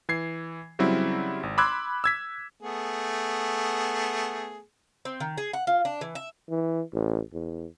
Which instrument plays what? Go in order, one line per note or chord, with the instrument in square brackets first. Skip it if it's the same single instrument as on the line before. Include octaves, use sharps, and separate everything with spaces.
[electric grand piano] E3 G#6 C7
C#3 F#3 G3 C4 E4
G#1
B5 C6 D6 E6 F#6 G#6
E6 G#6 B6
[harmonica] A3 B3 G#4
[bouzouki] C4
D#3
G#4
F#5
F4
D4
E3
E5
[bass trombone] E3
A1
E2